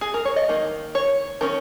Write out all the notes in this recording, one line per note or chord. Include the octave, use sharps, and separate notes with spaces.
G#4
A#4
C#5
D#5
D#3 A#3
C#5
D#3 C#4 A#4